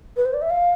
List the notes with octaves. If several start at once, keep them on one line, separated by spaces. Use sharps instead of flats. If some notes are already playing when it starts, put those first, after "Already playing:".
B4
C5
D5
E5
F5